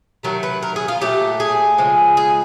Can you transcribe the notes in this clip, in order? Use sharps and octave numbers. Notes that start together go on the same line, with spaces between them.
C3 D#3 F#3 A3 A#4
B4
A#4
G#4
F4
A#2 F#3 A3 G4
G#4
C#3 F3 G#3
G#4